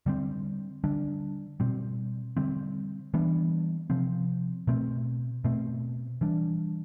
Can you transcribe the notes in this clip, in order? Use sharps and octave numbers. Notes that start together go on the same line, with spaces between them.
D3 G3 C4
D3 G3 D4
B2 G3 C4
D3 G3 C4
E3 G3 B3 D4
C3 F3 C4
B2 A3 C4
B2 A3 C4
E3 G3 D4